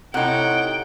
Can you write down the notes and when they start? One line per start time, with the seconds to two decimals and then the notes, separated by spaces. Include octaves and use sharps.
0.14 A2 C3 D#4 F#5 G5